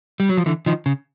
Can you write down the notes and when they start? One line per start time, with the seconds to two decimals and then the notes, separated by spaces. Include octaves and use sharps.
0.20 G3
0.29 F#3
0.37 F3
0.46 D3 E3
0.66 D#3 F3
0.86 C#3